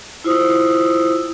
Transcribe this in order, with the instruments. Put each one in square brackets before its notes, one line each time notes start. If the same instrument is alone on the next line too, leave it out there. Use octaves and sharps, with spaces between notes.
[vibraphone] E4 F4 C5 D#6 E6